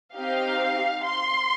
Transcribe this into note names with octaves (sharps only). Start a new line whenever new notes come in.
C4 D#4 G4 F5
C6